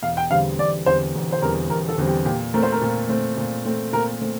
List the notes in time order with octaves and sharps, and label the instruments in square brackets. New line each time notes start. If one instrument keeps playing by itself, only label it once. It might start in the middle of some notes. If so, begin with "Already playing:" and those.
[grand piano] E1 [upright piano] F5
[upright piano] G5
[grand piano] E2 D3 G3 C4 [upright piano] F5
[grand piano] E1 [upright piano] D5
[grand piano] E2 D3 G3 C4 [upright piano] C5
[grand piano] E1
[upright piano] C5
[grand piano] E2 D3 G3 C4 [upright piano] A#4
[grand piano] E1 [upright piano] A#4
[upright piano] A4
[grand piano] E2 D3 G3 C4
[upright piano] G4
[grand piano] A#2 [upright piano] G4
[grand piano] A3 C4 [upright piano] A#4
[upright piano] C5
A#4
[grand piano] A#2
A3 C4
A#2
A3 C4
[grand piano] A#2 [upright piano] A#4
[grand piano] A3 C4